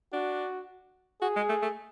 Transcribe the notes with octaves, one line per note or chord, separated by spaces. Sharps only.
D4 F#4
F#4 G#4
G#3
A3
A3